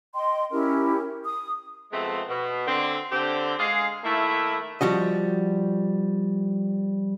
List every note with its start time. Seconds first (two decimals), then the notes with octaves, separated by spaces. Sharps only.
0.14 D#5 G5 C6
0.52 C#4 E4 G4 A#4
1.24 D#6
1.92 C3 F3 G#3 A3 B3 C4
2.29 B2
2.67 D3 C4
3.12 D3 C4 G4
3.59 G#3 G#4 F5
4.04 D#3 A3 A#3 E4
4.81 F3 G3 F#4 D#5